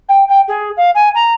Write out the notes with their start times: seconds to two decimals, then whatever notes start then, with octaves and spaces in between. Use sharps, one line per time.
0.08 G5
0.28 G5
0.47 G#4
0.76 F5
0.94 G#5
1.14 A#5